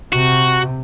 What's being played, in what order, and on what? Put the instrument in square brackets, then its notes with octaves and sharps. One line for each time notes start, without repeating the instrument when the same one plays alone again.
[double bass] C3 [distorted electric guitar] F#4